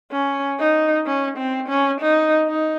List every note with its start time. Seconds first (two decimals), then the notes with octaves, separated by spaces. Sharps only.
0.11 C#4
0.59 D#4
1.06 C#4
1.37 C4
1.68 C#4
2.00 D#4
2.47 D#4